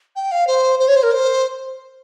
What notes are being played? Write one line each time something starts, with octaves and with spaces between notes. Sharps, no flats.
G5
F5
C5
C5
C#5
C5
A#4
C5